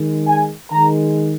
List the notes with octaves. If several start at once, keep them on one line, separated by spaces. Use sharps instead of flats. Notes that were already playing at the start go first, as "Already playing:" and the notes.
Already playing: D#3 G#3
G#5
D#3 G#3 A#5